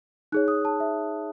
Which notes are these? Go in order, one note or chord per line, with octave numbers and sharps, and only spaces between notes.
D#4 G#4 C#5 F#6
D#6
A5
E5